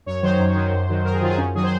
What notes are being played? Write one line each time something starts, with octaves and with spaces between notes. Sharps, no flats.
F#2 C#5
D#3 F#3 C5
F#2
D#3 F#3
F#2
D#3 F#3
F#2 A#4
G#4
D#3 F#3 F4
G#4
F#2 C#4
D#3 F#3 G#4
C5